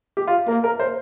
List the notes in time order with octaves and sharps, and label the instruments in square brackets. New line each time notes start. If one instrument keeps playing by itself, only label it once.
[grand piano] G4
F4
[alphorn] A#3 [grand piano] A#4
[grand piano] A#4
C5